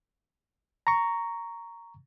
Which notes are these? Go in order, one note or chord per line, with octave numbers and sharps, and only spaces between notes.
A#5 C#6